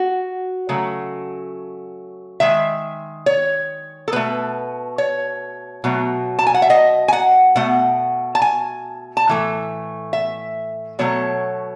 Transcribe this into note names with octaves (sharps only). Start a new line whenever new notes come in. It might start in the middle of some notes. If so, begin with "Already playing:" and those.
Already playing: F#4
C#3 F#3 A3
D#3 G#3 E5
C#5
A4
B2 A3 B4
C#5
B2 F#3 A3
A5
G#5
F#5
E5
D#5
G#5
F#5
B2 A3 F#5
A5
G#5
A5
A2 E3 A3
E5
B2 F#3 A3 C#5